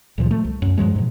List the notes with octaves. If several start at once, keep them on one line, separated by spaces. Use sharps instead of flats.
C#2 A#2 E3 F3
A3
C2
F#2
G2 F3 F#3 G#3
G#2 B2